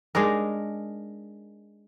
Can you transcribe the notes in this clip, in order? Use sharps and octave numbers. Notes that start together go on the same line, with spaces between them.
G#3 D4 D#4 A#4